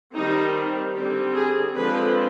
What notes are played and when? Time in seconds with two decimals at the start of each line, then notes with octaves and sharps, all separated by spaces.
0.14 D#3 G3 C4 D#4
0.94 D3 G3 C4 G4
1.36 G#4
1.75 D3 F3 G#3 C4 B4